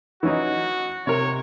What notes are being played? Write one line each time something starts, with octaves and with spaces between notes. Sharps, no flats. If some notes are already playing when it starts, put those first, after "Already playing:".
E3 C#4 D#4 F#4
C3 A#4 C#5